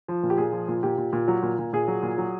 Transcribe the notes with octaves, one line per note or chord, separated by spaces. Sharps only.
F3
A#2
G4
A#2 G#4
F3
A#2
A#2 G4
A#2
A#2
F#3
A#2
A#2
A#2 G#4
F#3
A#2
F#3